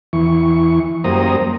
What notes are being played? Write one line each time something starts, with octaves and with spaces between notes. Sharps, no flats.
E2 E3 C#6
F#2 G3 A#3 C5 A#5 D#6